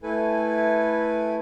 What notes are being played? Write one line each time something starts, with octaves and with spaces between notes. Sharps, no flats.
A3 E4 A4 B4 G#5